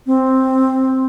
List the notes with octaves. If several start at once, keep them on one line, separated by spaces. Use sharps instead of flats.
C4